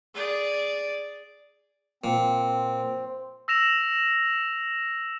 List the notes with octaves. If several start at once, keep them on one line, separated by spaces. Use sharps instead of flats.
G#4 D5
A#2 C4
E6 A#6 E7 F7